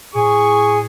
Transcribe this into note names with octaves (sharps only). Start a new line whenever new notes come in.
A2 G#4 C#6